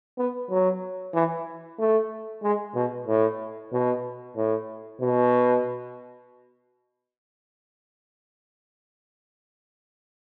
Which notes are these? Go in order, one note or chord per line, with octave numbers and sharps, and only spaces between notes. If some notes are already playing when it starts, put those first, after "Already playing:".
B3
F#3
E3
A3
G#3
B2
A2
B2
A2
B2